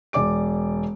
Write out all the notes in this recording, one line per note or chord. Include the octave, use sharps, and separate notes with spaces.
E1 D5 D6 D7